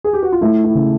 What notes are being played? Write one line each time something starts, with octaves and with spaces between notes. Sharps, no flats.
G#4
G4
F#4
F4
A3 E4
E4
C#3